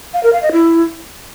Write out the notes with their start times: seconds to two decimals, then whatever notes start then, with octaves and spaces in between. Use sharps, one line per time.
0.14 F5
0.23 A#4
0.33 F5
0.42 D#5
0.52 E4